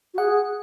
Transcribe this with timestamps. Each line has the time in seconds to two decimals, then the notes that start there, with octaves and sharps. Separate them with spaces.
0.14 F#4
0.18 G#4 F#5